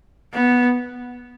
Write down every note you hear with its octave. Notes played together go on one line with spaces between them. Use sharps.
B3